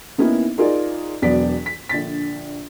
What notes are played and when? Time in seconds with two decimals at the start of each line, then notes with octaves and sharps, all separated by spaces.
0.18 D#3 A#3 B3 C#4 D#4 E4
0.58 D#4 F4 G#4 A#4 D5
1.22 E1 F#3 B3 D5 B6
1.66 B6
1.89 A#1 D3 A6 B6